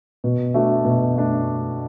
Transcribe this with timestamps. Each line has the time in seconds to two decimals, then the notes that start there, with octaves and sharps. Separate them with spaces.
0.24 B2
0.54 A3 D4 F#4
0.85 B2
1.16 A3 D4